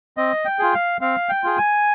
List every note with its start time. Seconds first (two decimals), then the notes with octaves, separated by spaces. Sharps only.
0.17 C4 D#5
0.45 G5
0.59 F4 G#4
0.74 F5
1.01 C4 F5
1.29 G5
1.44 F4 G#4
1.57 G#5